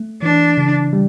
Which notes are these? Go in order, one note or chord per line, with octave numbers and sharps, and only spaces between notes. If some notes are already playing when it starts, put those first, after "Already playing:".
Already playing: A3
E3 D4
C#3
G3